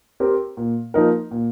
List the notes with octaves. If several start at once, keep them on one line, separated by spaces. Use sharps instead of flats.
C4 G4 A#4
A#2
F3 A#3 D#4 A#4
A#2